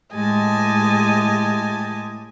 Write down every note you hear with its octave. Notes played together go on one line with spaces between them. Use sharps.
A2 G#3 G4 D#5 G#5 A5